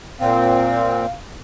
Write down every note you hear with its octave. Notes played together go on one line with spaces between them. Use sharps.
A#2 C4 F5